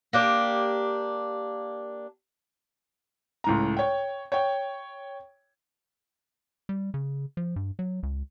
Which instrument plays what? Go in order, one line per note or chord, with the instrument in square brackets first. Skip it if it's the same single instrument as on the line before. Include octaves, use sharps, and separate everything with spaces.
[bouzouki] A#3 D4 G4
[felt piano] C#2 A2 A#5
C#5 G5
C#5 G5
[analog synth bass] G3
C#3
F3
G2
F#3
C#2